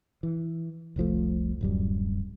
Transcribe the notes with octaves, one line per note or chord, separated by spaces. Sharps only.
E3
F1 C2 F3 A3
D1 F#2 G3